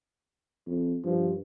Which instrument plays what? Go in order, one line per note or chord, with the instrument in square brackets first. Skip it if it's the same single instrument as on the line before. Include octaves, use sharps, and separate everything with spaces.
[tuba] F2
[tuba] G2 [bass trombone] F3